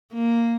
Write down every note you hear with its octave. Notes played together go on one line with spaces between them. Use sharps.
A#3